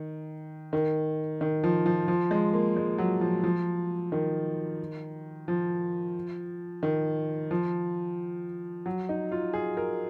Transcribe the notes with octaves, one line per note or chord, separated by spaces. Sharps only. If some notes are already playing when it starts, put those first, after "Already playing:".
Already playing: D#3
D#3
D#3
F3
F3
F3
G#3
A#3
G#3
F#3
F3
F3
D#3
F3
D#3
F3
F#3
D#4
F4
G#4
A#4